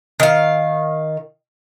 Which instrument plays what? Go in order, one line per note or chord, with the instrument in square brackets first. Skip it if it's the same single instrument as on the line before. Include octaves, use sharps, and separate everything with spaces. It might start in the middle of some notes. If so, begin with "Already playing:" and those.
[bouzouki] D#3 F5